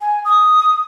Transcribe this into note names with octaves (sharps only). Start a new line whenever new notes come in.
G#5
D#6